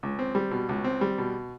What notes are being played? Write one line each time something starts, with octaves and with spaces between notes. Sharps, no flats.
C#2
C4
G3
B2
C#2
C4
G3
B2